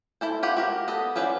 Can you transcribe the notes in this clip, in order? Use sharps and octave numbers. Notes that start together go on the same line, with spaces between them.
E4 A4 C5
F4 G4 F#5
F#4 G4 A#4
B3 A4 D#5
F#3 C#4 B4 C5 D5